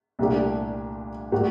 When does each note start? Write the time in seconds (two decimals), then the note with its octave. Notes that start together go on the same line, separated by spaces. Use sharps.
0.19 C2 A#2 A3 D4 G4
1.32 A2 G3 A#3 F#4